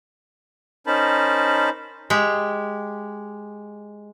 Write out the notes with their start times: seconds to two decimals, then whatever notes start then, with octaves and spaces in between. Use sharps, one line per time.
0.87 C#4 D#4 A#4 C5 A5 B5
2.10 G#3 G4